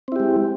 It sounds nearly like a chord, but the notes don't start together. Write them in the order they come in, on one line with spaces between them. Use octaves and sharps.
C4 E4 G4 G#3